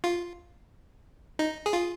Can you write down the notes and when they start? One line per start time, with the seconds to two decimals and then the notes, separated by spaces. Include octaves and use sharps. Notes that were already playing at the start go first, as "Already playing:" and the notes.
0.04 F4
1.39 D#4
1.66 G#4
1.73 F4